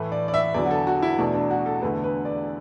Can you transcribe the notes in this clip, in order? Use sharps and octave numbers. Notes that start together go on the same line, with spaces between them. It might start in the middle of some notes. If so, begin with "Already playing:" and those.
Already playing: A2 E3 A3 B4
D5
D5
E5
E2 D3 F#3 D5
F#4
A4
F#4
E4
E2 B2 A3 D4
D4
F#4
A4
E2 D3 A3 B4
B4
D5